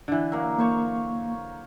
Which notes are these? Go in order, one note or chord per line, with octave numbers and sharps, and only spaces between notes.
D3 E3
F#3 A#3
A#3 C5 C#5 C#6